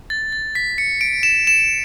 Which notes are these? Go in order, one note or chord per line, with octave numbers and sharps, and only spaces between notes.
A6
A6
B6
C#7
D7
E7
E7